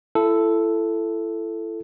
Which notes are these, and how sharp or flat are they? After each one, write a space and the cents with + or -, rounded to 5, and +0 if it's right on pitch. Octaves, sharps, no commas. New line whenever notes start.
E4 +30 A4 +0